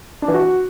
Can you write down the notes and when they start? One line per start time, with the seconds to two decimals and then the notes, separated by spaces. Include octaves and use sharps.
0.22 D4
0.28 E3
0.34 F#4